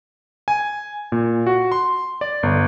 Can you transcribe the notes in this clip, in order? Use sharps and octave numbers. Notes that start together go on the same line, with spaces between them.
G#5
A#2
F#4
C6
D5
G1